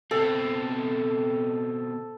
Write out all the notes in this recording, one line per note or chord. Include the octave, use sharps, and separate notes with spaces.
B2 C4 A4